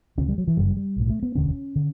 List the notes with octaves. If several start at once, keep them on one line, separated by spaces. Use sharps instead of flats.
D2 C#3 C#4
G3
F#3
E3
G1 F#2 C#3 G3
G3
B1 A2
A3
B3
E1 D2 D3 C#4
D3